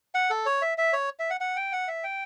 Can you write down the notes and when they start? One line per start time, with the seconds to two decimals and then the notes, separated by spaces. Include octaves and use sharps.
0.15 F#5
0.30 A4
0.46 C#5
0.62 E5
0.78 E5
0.93 C#5
1.19 E5
1.30 F#5
1.41 F#5
1.56 G5
1.72 F#5
1.88 E5
2.04 G5